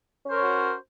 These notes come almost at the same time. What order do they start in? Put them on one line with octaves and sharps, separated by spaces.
C#4 C5 A#4 C#5 F#4